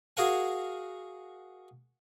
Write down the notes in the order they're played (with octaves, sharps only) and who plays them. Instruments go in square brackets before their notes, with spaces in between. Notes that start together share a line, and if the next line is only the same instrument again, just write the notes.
[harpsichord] F#4 G#4 A#4 F5 F#5 G#5